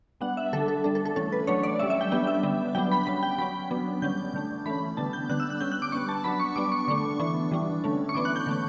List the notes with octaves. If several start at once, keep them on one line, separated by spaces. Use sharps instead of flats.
G3 B3 D4 F#5
E5
D3 G3 D4 A4
A4
G3 D4 A4
A4
A4
E3 A3 C#4 A4
B4
F#3 A3 D4 C#5
D5
G3 C#4 E5
E5
G5
G3 B3 D4 G5
E5
D3 G3 B3 D4
F#3 B3 D4 G5
B5
G3 C#4 B5
G5
F#3 C#4 B5
F#3 B3 D4
D3 G3 C#4 G6
D3 A3 D4
E3 A3 C#4 B5
D3 G3 B3 D4 A5
G6
D3 G3 B3 D4 F#6
E6
F#6
G3 C#4 G6
F#6
D6
G3 B3 D4 C#6
A5
F#3 B3 D4 B5
C#6
G3 B3 D4 D6
C#6
D3 A3 D4 C#6
E3 B3 D4
E3 G3 D4
D3 A3 C#4
C#6
E3 B3 D4 D6
F#6
G6
D3 A3 C#4